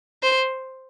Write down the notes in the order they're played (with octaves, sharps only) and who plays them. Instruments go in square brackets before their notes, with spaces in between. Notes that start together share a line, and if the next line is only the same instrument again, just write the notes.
[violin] C5